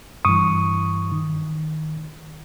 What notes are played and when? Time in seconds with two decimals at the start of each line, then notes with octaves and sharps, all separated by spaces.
0.25 G2 E3 C#6 D#6
1.12 D#3